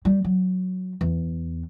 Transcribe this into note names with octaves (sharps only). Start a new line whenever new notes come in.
G3
F#3
E2